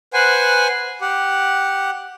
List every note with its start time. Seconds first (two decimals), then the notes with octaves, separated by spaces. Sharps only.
0.13 B4 C5 F#5 G#5
1.01 G4 F#5